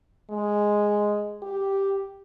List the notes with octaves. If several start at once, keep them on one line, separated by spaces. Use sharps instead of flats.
G#3
G4